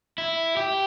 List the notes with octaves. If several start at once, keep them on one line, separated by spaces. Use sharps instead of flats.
E4
G4